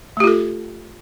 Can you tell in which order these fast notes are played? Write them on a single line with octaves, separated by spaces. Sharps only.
A3 G4 F4 A4